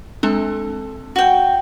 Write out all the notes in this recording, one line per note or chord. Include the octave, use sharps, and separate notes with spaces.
G#3 C4 D4 A4
F#4 G5